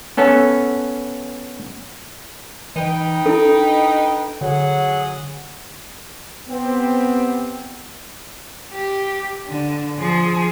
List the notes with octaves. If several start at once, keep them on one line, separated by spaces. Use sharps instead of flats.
B3 C#4 A4
E3 D#4 B4 G5
D4 E4 A4
D3 F#3 G#4 F#5
B3 C4 G4
G4
D3
F3 G#4